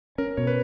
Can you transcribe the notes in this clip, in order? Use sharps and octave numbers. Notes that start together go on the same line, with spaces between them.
C#4 A#4
B2 C#5
B4